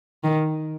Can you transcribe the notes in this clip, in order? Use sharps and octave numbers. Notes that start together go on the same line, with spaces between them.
D#3